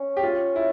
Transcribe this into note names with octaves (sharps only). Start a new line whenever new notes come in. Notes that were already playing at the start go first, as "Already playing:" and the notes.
Already playing: C#4
G4
F4
E4